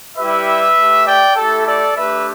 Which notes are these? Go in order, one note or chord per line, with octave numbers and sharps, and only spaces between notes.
G3 E4 G4 B4 E5
A3 G4
D5 G5
A3 E4 G4 A4
A4 D5
A3 D4 G4 B4 E5